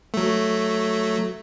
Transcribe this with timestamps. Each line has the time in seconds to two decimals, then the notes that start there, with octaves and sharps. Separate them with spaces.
0.14 F#3 A3